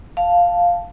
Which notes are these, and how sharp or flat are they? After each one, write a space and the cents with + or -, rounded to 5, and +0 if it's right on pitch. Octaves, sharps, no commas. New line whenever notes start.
F5 +0 A5 +0